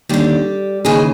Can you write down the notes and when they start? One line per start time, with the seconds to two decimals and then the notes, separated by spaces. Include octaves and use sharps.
0.09 D#2 D3 G3 G4
0.85 D#2 C#3 E3 G#3 G#4